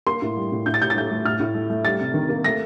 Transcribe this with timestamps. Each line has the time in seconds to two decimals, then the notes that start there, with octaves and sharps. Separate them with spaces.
0.07 A#3 C6
0.22 A2
0.36 G3
0.52 A2
0.66 A2 G6
0.74 A6
0.81 A2 G6
0.90 A6
0.96 A3 G6
1.11 A3
1.25 A2 F6
1.40 A2
1.55 A3
1.70 A3
1.84 G3 A6
2.00 C3
2.14 D#3
2.29 A#3
2.44 A3 A#6